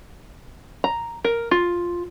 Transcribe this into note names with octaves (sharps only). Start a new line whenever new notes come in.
A#5
A#4
F4